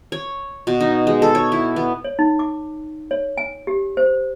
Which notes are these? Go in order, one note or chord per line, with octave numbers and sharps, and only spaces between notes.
C#5
B2
D#4
G#3
A4
C#5
E4
B3
C#5
D#4
D6
C#5
G#5
G4
C5